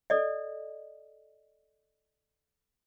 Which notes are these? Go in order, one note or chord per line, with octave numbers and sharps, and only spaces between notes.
A4 D5 D#5